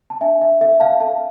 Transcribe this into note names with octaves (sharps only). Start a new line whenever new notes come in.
A5
D4 E5 G#5
E5
A4 E5
F5 A5
A4 F5 A5